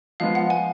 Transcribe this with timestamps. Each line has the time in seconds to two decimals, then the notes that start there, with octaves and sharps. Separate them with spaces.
0.20 F3 G#3 B3 F5
0.35 F#5
0.50 G#5